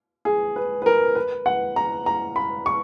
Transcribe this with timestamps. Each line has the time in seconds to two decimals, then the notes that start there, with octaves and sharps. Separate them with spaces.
0.25 G#4
0.56 B4
0.82 B4
0.86 A#4
1.15 B4
1.46 F#5
1.76 A#5
2.06 A#5
2.36 B5
2.66 C#6